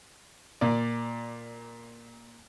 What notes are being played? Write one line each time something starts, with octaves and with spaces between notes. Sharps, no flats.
A#2 D5